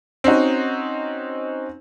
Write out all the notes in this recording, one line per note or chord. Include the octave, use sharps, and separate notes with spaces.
C4 C#4 D#4 F#4